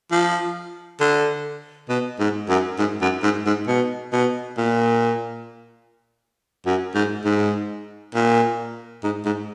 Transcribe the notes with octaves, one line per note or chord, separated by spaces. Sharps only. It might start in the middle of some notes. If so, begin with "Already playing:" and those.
F3
D3
B2
G#2
F#2
G#2
F#2
G#2
G#2
B2
B2
A#2
F#2
G#2
G#2
A#2
G#2
G#2